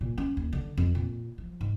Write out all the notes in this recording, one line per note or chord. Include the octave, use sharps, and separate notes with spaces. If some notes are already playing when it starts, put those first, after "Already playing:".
A#2
C#4
D#2
D3
F2
A#2
F3
G#2